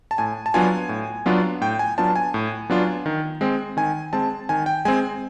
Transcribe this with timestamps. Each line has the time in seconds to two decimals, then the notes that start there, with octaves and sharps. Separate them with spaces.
0.11 A5
0.18 A2 G#5
0.46 A5
0.54 F#3 B3 D4 F4 G#5
0.89 A2
1.26 F#3 B3 D4 F4
1.61 A2 G5
1.79 G#5
1.98 F#3 B3 D4 F4 A5
2.16 G#5
2.34 A2
2.70 F#3 B3 D4 F4
3.06 D#3
3.41 G#3 C4
3.77 D#3 G#5
4.13 G#3 C4 A5
4.49 D#3 G#5
4.66 G5
4.85 G#3 C4 G#5